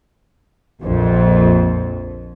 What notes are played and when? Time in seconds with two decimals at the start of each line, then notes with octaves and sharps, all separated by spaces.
0.80 A#1 F2